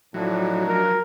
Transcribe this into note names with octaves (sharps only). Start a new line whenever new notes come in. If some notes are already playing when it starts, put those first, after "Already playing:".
A2 F3 F#3 D4 D#4
A#4